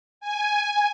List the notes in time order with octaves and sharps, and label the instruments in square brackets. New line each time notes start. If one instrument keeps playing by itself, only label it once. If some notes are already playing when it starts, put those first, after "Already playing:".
[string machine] G#5